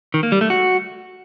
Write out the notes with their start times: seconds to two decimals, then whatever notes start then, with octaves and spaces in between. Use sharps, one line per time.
0.14 D#3
0.23 A#3
0.32 G3
0.41 A3
0.50 F#4